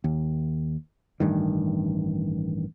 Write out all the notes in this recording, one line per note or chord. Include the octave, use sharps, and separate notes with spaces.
D#2
A1 G2 D#3